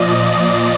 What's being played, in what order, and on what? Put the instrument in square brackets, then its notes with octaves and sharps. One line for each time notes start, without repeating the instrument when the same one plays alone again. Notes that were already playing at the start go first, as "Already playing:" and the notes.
Already playing: [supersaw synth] A#2 F3 D5 D#5